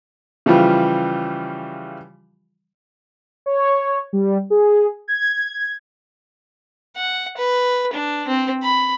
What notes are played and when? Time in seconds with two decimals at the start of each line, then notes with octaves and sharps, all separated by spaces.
0.46 C#3 E3 F3 G3 F4 G4
3.46 C#5
4.13 G3
4.50 G#4
5.08 G#6
6.96 F#5
7.37 B4
7.93 D4
8.28 C4
8.63 B5